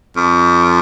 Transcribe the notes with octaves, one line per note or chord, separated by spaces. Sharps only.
F2